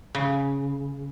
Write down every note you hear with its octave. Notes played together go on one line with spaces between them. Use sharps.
C#3